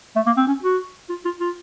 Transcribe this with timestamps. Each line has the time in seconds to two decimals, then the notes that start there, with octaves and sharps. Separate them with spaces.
0.16 A3
0.26 A#3
0.37 C4
0.47 C#4
0.63 F#4
1.10 F4
1.25 F4
1.41 F4